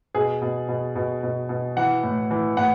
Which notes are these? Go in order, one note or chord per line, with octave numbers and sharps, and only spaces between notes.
B2 G#4
B2
B2
B2
B2
B2
E3 F#5
A2
E3
A2 F#5